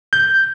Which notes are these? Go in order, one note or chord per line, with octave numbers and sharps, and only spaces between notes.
G6